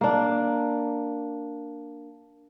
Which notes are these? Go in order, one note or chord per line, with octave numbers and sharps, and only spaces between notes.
A#3 D4